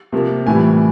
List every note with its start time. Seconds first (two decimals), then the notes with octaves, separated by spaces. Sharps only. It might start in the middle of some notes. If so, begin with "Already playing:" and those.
0.12 C3 F3 A#3
0.46 A2 E3 G3 G#5